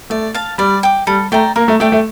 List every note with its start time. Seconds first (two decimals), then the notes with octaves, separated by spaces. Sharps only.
0.10 A3 D5
0.34 F5 A5
0.58 G3 D5
0.83 G5 D6
1.07 G3 A4
1.32 A3 D5 G5 A#5
1.56 A#3 A#4
1.68 A3
1.80 A3 D5 G5 D6
1.92 A3